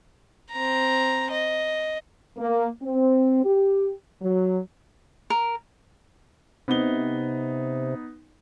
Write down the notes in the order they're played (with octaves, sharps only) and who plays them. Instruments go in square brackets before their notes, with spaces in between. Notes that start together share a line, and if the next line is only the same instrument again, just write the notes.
[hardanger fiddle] C4 A#5
D#5
[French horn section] A#3
C4
G4
F#3
[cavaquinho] A#4
[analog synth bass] C3 [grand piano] B3 D#4 G7